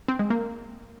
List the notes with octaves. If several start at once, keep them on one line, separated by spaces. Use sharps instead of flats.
C4
G#3
A#3